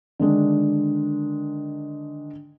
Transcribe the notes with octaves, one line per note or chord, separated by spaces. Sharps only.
D3 D#3 G#3 D4